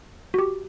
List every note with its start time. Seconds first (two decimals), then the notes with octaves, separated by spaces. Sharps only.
0.34 F#4
0.39 G4